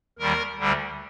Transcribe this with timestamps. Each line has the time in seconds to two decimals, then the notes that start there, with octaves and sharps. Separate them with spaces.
0.19 D#2 D#3 G3 A#4
0.59 D2 D3 G3